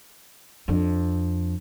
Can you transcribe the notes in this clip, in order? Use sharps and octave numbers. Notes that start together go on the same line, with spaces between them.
F2 D4